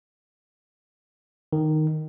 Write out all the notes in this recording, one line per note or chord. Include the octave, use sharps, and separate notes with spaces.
D#3